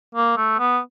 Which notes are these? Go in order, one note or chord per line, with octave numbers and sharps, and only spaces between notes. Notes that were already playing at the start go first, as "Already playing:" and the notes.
A#3
A3
B3